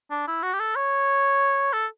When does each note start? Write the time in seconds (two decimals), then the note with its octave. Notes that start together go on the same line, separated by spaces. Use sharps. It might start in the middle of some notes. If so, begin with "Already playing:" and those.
0.10 D4
0.27 E4
0.42 F#4
0.53 G4
0.60 A4
0.76 C#5
1.73 A4